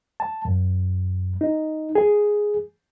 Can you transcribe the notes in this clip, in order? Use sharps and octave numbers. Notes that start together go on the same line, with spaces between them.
A5
F#2
D#4
G#4